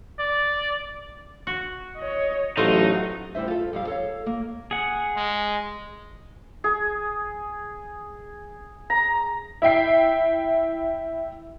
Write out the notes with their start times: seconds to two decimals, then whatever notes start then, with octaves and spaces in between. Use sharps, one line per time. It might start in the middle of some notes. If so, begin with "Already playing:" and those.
0.19 D5
1.47 F#4
1.97 C#5 D#5
2.57 A1 F#3 A3 D#4 F4 F#4 C5
3.35 D2 G3 E4 C5 E5
3.48 F4 A4
3.73 F2 G3 F5
3.87 A4 C#5 F5
4.26 A#3
4.71 G#4 F#5
5.17 G#3
6.64 G#4
8.90 A#5
9.62 E4 E5 G5 C7